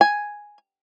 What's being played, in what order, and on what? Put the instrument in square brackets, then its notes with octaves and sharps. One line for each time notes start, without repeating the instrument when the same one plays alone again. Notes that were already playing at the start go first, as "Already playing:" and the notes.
[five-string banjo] G#5